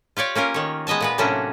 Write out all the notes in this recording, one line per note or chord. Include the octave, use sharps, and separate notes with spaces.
F4 G4 C#5 D5
A#3 C#4 F4 A#4
D#3 C#5
G#3 B3 D#5 E5 A5
A#2 B3 B4
A2 C3 F#3 A#3 C#4 D4